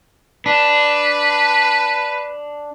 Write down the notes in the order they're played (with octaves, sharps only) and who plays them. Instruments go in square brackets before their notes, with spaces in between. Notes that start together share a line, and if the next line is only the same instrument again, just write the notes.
[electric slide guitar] D4 [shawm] B4